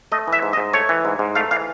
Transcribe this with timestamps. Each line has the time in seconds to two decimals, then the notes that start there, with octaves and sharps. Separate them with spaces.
0.12 A3 D#5
0.27 E3
0.33 E5
0.42 G#2
0.53 D#5
0.57 G#2
0.73 A3 C#5
0.89 E3
1.05 G#2
1.19 G#2
1.35 A3 F5
1.51 E3 F5